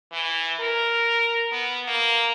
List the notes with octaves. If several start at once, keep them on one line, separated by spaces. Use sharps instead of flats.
E3
A#4
B3
A#3